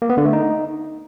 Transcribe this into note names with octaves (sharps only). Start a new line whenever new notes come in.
A#3
B3
D3
A3
D#4